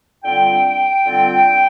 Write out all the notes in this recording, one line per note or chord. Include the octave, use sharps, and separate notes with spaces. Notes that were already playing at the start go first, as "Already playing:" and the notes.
D3 G3 C4 F4 G5
D3 G3 C4 F4